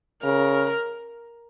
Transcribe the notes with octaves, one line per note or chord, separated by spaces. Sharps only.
C#3 A#4